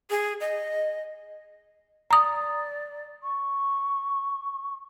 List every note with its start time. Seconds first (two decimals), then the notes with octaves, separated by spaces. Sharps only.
0.10 G#4
0.40 D#5
2.11 D5 A#5 D#6
3.23 C#6